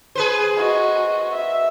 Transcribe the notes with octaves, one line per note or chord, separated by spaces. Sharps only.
G#4 B4 C5
F#4 D#5
E5